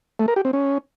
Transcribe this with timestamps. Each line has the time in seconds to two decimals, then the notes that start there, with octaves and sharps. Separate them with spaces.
0.19 A3
0.28 A#4
0.36 G4
0.45 C4
0.53 C#4